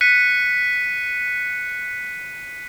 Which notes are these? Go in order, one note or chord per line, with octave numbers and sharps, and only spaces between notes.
F#6 B6 C#7 D#7